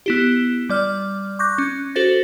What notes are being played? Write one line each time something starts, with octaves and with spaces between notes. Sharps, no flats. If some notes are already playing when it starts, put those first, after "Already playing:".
B3 E4 G4
G3 D5 F6
C#6 D6 F#6 G6 A#6
C#4
F#4 A4 C5 A6 A#6